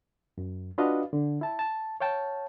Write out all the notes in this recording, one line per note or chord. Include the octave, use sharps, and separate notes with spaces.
F#2
D4 F4 F#4 B4 D#5 F5
D3
E4 A5
A5
C#5 F5 G5 A5